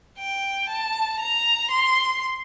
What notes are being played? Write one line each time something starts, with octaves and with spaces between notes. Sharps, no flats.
G5
A5
A#5
C6